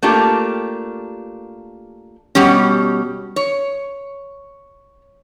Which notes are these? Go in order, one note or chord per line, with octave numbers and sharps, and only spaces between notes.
A3 A#3 D4 F4 G4
B2 G3 C#4
C#5